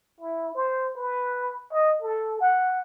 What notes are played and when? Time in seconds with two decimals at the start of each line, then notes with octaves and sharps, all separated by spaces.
0.20 E4
0.55 C5
0.96 B4
1.73 D#5
2.02 A4
2.41 F#5